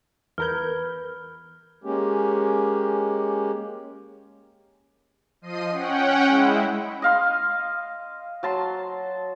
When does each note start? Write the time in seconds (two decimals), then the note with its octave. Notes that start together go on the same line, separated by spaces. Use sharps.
0.38 E2 A#4 B4 B5 F6 G6 G#6
1.84 G#3 A#3 C#4 G4
5.42 F3 D#5 C7 D#7
5.72 C#4 F#5 G5
6.27 G#3 E4
7.02 D#5 F5 C6
8.43 F#3 A5 C6